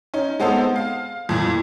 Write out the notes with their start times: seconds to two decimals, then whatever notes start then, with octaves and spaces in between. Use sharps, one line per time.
0.14 C#4 D#4
0.40 G#3 B3 C4 A4
0.76 F5
1.29 F2 A#2 E3